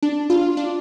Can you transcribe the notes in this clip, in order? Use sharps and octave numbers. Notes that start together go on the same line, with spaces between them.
D4
F4
D4